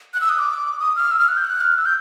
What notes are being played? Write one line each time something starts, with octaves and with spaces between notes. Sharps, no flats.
F#6
E6
D#6
D6
D#6
F6
E6
F6
F#6
G6
F#6
F6
E6
G6